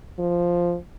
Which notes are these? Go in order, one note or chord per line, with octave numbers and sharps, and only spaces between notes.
F3